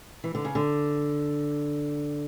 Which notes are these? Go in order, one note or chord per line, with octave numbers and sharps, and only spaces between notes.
E3
D3
C#3
D3